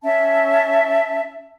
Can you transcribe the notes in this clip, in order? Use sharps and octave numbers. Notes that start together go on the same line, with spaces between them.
C#4 E5 A5